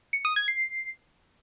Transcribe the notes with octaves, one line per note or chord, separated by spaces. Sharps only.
C#7
D#6
G#6
C7